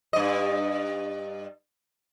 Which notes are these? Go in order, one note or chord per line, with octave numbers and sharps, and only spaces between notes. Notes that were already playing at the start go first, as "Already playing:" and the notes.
G2 D#5